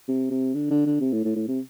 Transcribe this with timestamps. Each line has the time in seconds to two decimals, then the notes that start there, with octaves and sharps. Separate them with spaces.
0.09 C3
0.31 C3
0.54 D3
0.71 D3
0.86 D3
1.01 C3
1.12 A2
1.25 A2
1.36 A2
1.48 C3